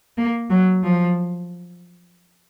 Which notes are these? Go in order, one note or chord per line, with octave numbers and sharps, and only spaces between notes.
A#3
F#3
F3